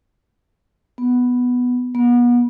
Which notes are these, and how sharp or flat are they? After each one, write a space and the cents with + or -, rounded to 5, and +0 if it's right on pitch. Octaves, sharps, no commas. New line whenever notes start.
B3 +0
B3 -35